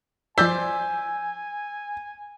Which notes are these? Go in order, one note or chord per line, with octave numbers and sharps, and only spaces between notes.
F3 C5 D5 G#5 E6 G6 B6